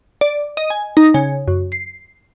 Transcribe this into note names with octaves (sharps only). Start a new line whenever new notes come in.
D5
D#5
G#5
D#4
C#3
F#2
C7